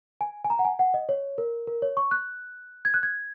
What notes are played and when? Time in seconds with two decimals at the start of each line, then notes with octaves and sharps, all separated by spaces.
0.21 G#5
0.44 G#5
0.50 A#5
0.59 F#5
0.65 G#5
0.79 F#5
0.94 D#5
1.09 C#5
1.38 A#4
1.67 A#4
1.82 C#5
1.97 C#6
2.11 F#6
2.85 G#6
2.94 F#6
3.03 G#6